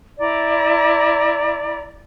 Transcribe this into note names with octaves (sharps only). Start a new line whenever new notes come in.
E4 D5 A#5